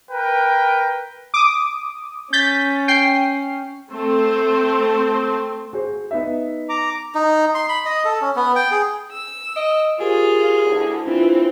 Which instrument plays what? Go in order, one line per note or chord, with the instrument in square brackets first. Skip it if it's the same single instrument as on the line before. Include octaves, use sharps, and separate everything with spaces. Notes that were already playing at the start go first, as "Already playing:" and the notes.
[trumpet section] A#4 B4 G5
[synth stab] D6 D#6
[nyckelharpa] C#4 [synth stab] G6 A6 B6
[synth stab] G5 C7
[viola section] A3 C4 C5
[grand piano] F#4 G#4 C5
B3 D#4 E5
[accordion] A#5 D6
[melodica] D#4
C6
B5
D#5
A4
C#4
B3
G5
G#4
[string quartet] E6
[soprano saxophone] D#5 [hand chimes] D7
[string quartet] F4 [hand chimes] G4 A#4 C5 [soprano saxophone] G#4
[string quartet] D2 [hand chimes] E4
[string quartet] E3 C4 [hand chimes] D4 E4 F4